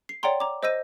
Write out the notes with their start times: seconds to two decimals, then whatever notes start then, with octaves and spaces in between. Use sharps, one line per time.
0.09 C7
0.23 C#5 D5 F#5 G5 A#5 C6
0.40 A#5 D6
0.63 C5 D#5 E6 G6 A#6 D#7